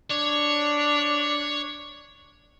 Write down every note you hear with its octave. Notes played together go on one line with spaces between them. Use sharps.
D4 C#5